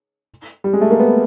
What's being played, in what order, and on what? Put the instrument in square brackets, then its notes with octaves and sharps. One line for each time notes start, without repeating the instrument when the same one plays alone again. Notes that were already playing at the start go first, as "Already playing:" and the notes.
[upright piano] G3
G#3
A3
A#3
B3